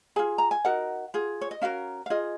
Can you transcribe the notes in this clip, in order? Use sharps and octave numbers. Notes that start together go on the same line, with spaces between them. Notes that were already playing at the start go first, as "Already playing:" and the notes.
F4 G#4 G#5
A#5
G#5
D#4 F#4 A#4 F#5
F4 G#4
C#5
D#5
C#4 F#4 A#4 F5
F5
F4 G#4 D#5